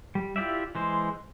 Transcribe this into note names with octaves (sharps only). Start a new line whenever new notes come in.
G3
E4 F4 G4 D5 E5
E3 G#3 C5